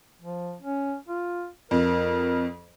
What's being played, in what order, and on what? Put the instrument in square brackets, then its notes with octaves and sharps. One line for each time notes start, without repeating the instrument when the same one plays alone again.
[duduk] F3
C#4
F4
[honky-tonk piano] F2 [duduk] A#4